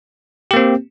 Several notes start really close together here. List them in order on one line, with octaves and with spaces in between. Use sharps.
G4 A#3 C4